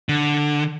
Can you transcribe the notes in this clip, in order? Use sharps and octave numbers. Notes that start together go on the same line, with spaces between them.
D3